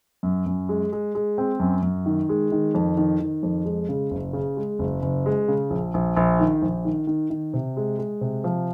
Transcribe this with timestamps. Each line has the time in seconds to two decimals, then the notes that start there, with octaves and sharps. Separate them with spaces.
0.23 F#2
0.46 F#2
0.69 G#3
0.92 G#3
1.15 G#3
1.38 C4
1.60 F#2
1.83 F#2
2.06 D#3
2.29 G#3
2.52 D#3
2.75 F2
2.97 D#3
3.20 D#3
3.43 F2
3.65 G#3
3.89 C#3
4.11 F#1
4.33 C#3
4.57 G#3
4.79 F#1
5.02 F#1
5.26 G#3
5.48 C#3
5.70 A#1
5.94 A#1
6.17 A#1
6.40 D#3
6.62 A#1
6.85 D#3
7.07 D#3
7.30 D#3
7.54 C3
7.77 G#3
7.99 G#3
8.21 C3
8.44 F3